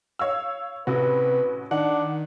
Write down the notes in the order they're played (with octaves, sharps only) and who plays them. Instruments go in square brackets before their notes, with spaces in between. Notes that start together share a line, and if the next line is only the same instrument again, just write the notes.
[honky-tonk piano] C#5 F5 E6
[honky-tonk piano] A1 F#4 [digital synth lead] C3 [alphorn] B4
[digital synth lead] D#3 [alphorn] D4 [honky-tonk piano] F#5